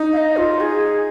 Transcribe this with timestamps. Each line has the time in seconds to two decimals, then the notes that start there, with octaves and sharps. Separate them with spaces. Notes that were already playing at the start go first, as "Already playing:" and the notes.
Already playing: D#4
0.13 F5
0.18 D#5
0.37 F4
0.60 G#4